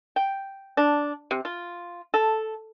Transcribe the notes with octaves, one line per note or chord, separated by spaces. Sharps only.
G5
D4
C3
F4
A4